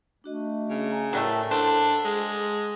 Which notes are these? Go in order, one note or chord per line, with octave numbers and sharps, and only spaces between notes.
A3 D4 F#4 D#5
C#3
G#5 A#5
A2 F#3 G3 A3 A4 A#4 G5
D4 A4 C5 F#5
G#3 G#4